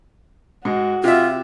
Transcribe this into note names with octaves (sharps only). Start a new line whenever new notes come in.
G#2 G#3 F#4
C3 F4 E5